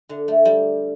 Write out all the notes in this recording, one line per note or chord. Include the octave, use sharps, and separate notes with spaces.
D3
A3
G3